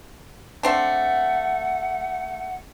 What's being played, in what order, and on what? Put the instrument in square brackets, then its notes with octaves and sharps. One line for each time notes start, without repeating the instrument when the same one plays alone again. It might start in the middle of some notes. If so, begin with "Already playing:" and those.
[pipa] A3 C4 D4 [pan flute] F#5